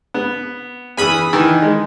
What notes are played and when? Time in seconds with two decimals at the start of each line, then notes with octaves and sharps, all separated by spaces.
0.14 B3
0.97 E2 E3 G#5 B5 D#6
1.33 D#3 E3
1.62 G#3